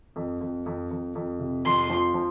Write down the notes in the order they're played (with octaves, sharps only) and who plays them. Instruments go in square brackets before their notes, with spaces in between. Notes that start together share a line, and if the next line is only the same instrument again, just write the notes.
[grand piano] F2
F2
F2
F2
F2
C3
[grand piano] F2 [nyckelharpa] C6
[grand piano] F3
F3